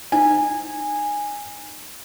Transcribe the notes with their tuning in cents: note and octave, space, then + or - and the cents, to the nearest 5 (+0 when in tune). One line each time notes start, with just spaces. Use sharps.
D#4 -25 G#5 -15